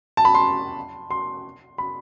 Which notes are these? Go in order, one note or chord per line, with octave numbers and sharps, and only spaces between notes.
A5
B5
C6
C6
B5